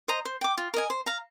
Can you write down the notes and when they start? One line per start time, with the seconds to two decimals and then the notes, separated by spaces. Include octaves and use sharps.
0.08 C5 D#5 A#5
0.25 C5
0.41 G5 D6
0.58 F4
0.74 A#4 D#5 G#5
0.90 C5
1.06 F5 A#5